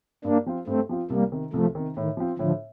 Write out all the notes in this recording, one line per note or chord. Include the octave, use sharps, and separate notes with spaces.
G2 A#3 D4
F3 C4 F4
G2 A3 C4
F3 C4 F4
C2 G3 A#3
C3 D#3
C2 F3 A3
C3 D#3
A2 D#3
F3 C4 F4
A2 D3 F3